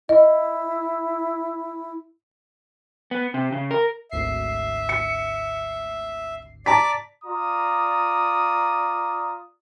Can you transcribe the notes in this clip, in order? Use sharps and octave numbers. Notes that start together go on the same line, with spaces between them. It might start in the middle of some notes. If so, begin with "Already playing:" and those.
E4 D#5
B3
C3
C#3
A#4
G#1 D2 E5 C7
C#7
D5 A5 A#5 D6 B6
F4 D5 A#5 D#6